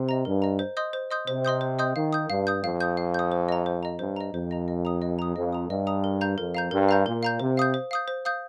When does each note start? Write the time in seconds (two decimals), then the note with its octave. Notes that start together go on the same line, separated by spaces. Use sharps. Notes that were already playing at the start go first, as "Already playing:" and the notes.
Already playing: C3
0.09 D#5 A#5
0.25 G2 A#4
0.42 D#5 A#5
0.59 C5
0.77 D#5 C6 D#6 G6
0.93 C5
1.11 D#5 C6 D#6 G6
1.28 C3 C5
1.45 D#5 C6 D#6 G6
1.61 C5
1.79 D#5 C6 D#6 G6
1.96 D#3 F5
2.13 D#6 G6
2.30 G2 F5
2.47 D#6 G6
2.63 F2 F5
2.80 D#6 G6
2.97 F5
3.14 D#6 G6
3.32 C5
3.49 D#5 A#5
3.66 C5
3.83 D#5 A#5
3.99 G2 C5
4.16 D#5 A#5
4.33 F2 C5
4.51 D#5 A#5
4.68 D#5
4.85 A#5 D#6
5.02 D#5
5.19 A#5 D#6
5.36 F2 D#5
5.53 A#5 D#6
5.69 G2 D#5
5.87 A#5 D#6
6.04 A#4
6.21 F5 A#5 G6
6.37 F2 A#4
6.54 F5 A#5 G6
6.71 G2 A#4
6.89 F5 A#5 G6
7.06 A#2 A#4
7.23 F5 A#5 G6
7.40 C3 C5
7.57 F5 D#6 G6
7.74 C5
7.91 F5 D#6 G6
8.08 C5
8.25 F5 D#6 G6